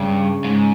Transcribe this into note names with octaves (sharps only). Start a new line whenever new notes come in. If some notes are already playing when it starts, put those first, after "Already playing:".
Already playing: G2 C#3
G#2